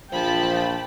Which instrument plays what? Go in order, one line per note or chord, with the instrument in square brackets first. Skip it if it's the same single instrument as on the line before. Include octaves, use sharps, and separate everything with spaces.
[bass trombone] A#1 [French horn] F3 [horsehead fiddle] G5 [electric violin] A5 B5